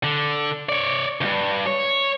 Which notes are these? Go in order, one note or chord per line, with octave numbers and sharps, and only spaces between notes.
D3
C#5 D5
D2 G2
C#5